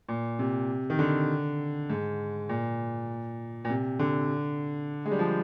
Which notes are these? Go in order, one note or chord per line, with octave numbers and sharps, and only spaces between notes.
A#2
C3
D#3
D3
G#2
A#2
A#2
C3
D3
G#3
G3
F3